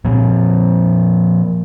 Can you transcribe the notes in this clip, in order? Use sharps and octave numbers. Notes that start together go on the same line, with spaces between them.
A#2 F3 C4